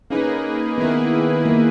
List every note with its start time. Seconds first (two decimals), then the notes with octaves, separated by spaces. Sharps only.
0.10 A#3 C#4 D#4 G#4 B4
0.78 D#3 A#3 B3 E4 G#4 B4
1.46 A#3